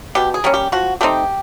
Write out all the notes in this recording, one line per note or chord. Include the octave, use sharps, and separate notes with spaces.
B2 G4
G#4
G3 A#3 C#4
G4
F3 F#4
A3 C4 D#4 G4